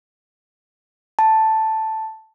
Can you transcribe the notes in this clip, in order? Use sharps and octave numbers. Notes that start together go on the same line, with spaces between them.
A5